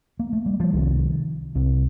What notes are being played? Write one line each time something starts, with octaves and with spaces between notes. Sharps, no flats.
A#3
A3
G3
F3
C2 C3 D#3
C2 C3